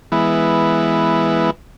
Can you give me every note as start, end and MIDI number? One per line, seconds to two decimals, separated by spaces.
0.12 1.50 52
0.12 1.50 56
0.12 1.50 59
0.12 1.50 64